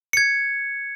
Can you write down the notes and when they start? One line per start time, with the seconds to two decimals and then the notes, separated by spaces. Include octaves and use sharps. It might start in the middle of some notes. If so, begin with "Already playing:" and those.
0.13 G#6 C#7